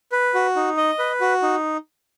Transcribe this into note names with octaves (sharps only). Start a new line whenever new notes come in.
B4
F#4
D#4
D#5
B4
F#4
D#4